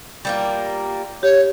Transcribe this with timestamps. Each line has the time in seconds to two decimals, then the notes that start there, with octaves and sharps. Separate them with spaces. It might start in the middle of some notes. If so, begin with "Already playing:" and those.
0.25 G3 A#3 F4
1.23 G4 C#5